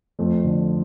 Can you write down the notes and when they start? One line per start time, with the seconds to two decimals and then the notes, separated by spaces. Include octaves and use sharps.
0.19 F2 A3
0.44 D3